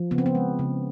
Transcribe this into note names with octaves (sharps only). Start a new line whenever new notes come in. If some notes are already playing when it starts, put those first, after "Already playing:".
Already playing: F3
C#3 B3
C4
B3
G#3
C#3